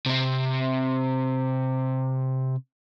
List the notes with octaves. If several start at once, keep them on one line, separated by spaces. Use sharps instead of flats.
C3 C4